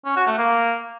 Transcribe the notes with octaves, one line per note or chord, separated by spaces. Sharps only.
C#4
F#4
A3
A#3